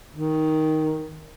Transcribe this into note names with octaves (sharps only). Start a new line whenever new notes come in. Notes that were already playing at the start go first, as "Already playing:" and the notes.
D#3